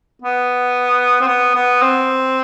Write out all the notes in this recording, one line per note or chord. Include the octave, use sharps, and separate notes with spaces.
B3
C4
B3
B3
C4